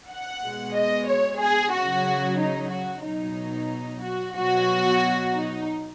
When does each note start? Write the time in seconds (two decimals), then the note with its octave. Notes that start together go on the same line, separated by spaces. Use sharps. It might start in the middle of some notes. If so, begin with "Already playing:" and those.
0.10 F#5
0.42 B2 G#3
0.75 D#5
1.08 C#5
1.40 G#4
1.73 C#3 F#3 F#4
2.39 D#4
2.72 F#4
3.04 B2 F#3 D#4
4.02 F#4
4.35 B2 F#3 F#4
5.33 D#4